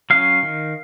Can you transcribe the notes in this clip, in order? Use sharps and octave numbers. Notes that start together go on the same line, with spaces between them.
F#3 C#4 F5
D#3